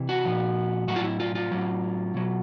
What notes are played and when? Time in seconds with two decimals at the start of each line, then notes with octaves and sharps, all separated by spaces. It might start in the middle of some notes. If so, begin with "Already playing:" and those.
Already playing: C3 E3
0.09 F#4
0.25 A#2 F3
0.88 A2 F#3 F#4
0.96 F4
1.04 E4
1.20 F4
1.35 F4
1.51 A2 F#3
2.14 B2 F#3